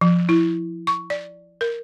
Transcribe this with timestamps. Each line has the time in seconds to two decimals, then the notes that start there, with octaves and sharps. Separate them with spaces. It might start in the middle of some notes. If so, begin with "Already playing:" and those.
0.01 F3
0.29 E4
0.87 C#6
1.10 D5
1.61 A#4